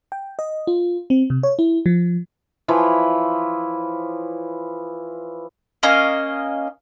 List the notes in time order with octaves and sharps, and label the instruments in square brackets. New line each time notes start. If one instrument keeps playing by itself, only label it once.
[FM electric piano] G5
D#5
F4
C4
C3
C#5
E4
F3
[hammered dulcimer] E3 F3 E4 C#5
[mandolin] A#3 C#4 D#5 F5